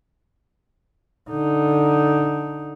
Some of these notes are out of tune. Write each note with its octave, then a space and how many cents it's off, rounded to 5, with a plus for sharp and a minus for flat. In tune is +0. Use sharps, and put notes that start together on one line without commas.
D3 +0 D#4 +0